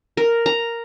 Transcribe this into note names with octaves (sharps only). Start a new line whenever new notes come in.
A#4
A#5